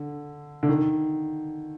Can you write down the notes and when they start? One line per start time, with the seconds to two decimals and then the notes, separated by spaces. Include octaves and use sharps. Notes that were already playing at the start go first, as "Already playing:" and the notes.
Already playing: D3
0.63 D3
0.69 D#3